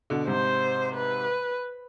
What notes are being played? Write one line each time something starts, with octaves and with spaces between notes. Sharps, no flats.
B2 D3
G#2 C3 C5
B4